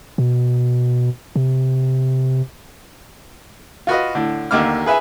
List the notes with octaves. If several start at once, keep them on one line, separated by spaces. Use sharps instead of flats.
B2
C3
F4 F#4 B4 D#5
A2 D3
A1 D#2 D3 A#3 D6 F6
G#4 B4 E5 G#5